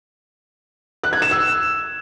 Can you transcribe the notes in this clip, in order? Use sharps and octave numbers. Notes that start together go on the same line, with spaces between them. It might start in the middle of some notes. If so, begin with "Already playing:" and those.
F#6
G#6
E7
E6